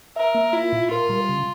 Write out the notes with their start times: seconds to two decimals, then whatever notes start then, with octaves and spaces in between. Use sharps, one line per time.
0.16 A#4 E5
0.35 A#3
0.53 E4 F4
0.72 A#2
0.90 F4 A#4
1.10 G3
1.29 C#3